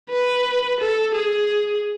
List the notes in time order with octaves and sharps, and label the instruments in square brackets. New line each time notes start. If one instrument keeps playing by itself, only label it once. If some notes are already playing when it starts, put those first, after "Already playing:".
[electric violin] B4
A4
G#4